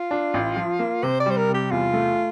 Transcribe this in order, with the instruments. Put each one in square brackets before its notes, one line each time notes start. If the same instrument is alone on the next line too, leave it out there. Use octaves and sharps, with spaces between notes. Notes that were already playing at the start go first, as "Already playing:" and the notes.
Already playing: [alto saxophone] F4
[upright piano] D4
A1
F3
A#3
[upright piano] C3 [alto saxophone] C5
[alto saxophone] D5
[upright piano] G3 [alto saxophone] C5
[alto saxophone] A#4
[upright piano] C3
[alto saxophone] G4
[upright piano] E2 [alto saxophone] F4
[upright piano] A3